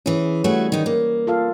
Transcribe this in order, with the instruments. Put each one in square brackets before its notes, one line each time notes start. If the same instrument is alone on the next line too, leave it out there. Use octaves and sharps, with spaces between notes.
[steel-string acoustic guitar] E3 G#4 [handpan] C#4
[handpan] G3 B4 C#5 [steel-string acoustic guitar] A3 F#4 G#4
[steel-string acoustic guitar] D#3 D#4
A#3
[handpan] F4 A4 F5